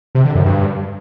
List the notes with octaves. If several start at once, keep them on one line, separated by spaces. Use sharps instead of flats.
C3
D3
F#2
G2